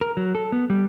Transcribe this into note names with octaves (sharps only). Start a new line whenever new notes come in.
A#4
F#3
A4
B3
G3